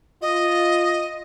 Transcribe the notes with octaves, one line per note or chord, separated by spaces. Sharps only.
F4 D#5